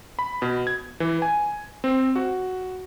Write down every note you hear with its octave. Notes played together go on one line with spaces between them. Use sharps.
B5
B2
G#6
E3
G#5
C4
F#4